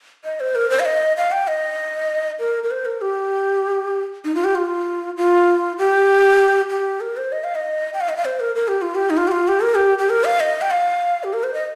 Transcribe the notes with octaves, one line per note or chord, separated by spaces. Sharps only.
D#5
C5
A#4
C5
F5
D#5
F5
G5
D#5
A#4
A#4
C5
A#4
G4
D#4
F4
G4
F4
F4
G4
G4
A#4
C5
D#5
F5
D#5
G5
F5
D#5
F5
C5
A#4
A#4
G4
F4
G4
D#4
F4
G4
F4
G4
A#4
G4
G4
A#4
F5
D#5
G5
F5
G4
A#4
C5
D#5